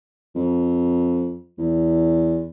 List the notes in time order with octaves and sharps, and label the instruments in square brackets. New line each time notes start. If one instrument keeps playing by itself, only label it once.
[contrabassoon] F2
E2